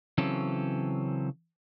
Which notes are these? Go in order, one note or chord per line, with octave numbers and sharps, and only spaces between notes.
C#3 E3 F#3 C4 C#4 A4